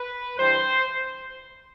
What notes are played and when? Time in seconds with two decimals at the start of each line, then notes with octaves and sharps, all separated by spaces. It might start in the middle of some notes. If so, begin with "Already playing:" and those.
Already playing: B4
0.39 G2 E3 G3 C5